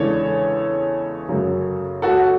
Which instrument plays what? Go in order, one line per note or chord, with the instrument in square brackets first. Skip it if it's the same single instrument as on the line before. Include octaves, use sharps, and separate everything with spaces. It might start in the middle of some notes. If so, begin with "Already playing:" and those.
Already playing: [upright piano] E2 C#3 G#3 D4 A4 C#5
F#2 C#3 F#3
F#4 A4